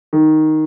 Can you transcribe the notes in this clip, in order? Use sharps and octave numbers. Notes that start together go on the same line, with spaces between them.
D#3